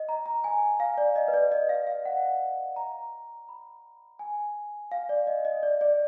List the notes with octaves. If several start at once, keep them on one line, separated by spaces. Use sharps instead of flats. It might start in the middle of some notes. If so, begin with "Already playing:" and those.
Already playing: D#5
A#5
A#5
G#5
F5
D5
D#5
B4
D5
D#5
F5
F5
F#5
A#5
B5
G#5
F5
D5
D#5
D#5
D5
D5